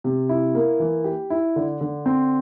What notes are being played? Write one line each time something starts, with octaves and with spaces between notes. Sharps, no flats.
C3
E4
A#3
E3
G4
E4
D3
D3
C4